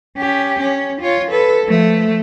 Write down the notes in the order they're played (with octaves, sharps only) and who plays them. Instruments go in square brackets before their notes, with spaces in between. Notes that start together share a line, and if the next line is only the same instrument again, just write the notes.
[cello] C#4 G4
C#4
F4 C#5
A4 B4
F3 A3